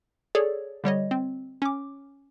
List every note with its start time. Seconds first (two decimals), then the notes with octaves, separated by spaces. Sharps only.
0.35 G#4 A4 C#5 D5
0.84 D3 G3 C#5 D#5
1.11 C4
1.62 C#4 D6